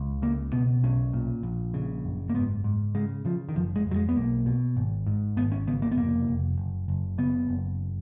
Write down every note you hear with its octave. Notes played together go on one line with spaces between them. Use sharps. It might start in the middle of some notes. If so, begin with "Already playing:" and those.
Already playing: C#2
C#3 A#3
B2 B3
B1 C#4
A#2
A#1
C#3
F#1
A#3
G#2 B3
G#2
C#3 G#3
C#3 F3
D#3
F#1 F3
G#3
F2
F#3
G#3
B3
B1 A#3
B2
G#1
G#2
G#1 B3
C#4
C#3 B3
A#3
B3
F1 A#3
F1
F#1
F#1
C#3 B3
F#1